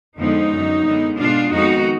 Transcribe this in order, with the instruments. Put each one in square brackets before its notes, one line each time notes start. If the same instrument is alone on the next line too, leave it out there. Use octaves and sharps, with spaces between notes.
[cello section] F2 D3 F3 G#3 B3 D#4
F#2 D3 F#3
F#2 D3 G#3 B3
B2 G#3 B3 D4 F4
F2 D#3 G#3 B3 D#4 F#4